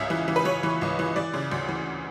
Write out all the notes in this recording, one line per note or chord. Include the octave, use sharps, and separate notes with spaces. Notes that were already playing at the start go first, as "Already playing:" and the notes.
Already playing: C#2 C#3 E5
E3
E3
B4
E3 C#5
E3
C#2
E3
E3 D5
C#3
D2
E3